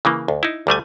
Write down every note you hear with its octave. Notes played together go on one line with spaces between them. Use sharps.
C#3 E3 A#3
D2
D#4 E4
D2 G3 A3 G#5